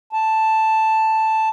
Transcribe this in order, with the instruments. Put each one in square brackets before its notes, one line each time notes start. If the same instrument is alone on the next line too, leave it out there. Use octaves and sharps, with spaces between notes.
[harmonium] A5